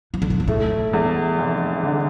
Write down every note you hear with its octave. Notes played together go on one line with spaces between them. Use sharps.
E3
D3
C3
B2
A2 A3
E2
F1
D3